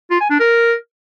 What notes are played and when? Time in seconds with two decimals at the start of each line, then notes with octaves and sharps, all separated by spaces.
0.11 F4
0.20 G#5
0.30 D4
0.40 A#4